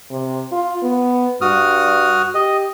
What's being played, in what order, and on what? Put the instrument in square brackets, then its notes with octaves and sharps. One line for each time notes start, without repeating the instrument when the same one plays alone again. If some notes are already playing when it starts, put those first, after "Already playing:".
[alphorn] C3
F4
B3
[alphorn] G2 [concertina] F#4 D#6 F6
[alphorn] G4 [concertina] D#5